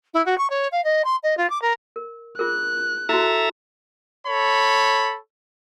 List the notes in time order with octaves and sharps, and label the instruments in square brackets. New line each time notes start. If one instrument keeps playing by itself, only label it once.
[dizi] E4
F#4
C#6
C#5
F5
D#5
C6
D#5
F4
D6
A#4
[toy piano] A#4
[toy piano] F4 G#4 A#4 [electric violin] F#6
[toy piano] E4 F#4 [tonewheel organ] A4 E5 A#5
[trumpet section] A4 C#5 B5